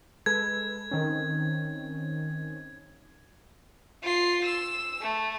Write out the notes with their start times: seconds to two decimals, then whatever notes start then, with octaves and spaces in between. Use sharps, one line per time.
0.26 G#3 A4 B4 G#6
0.91 D#3 C4 C#4
4.03 F4 C7
4.46 E6
5.02 A3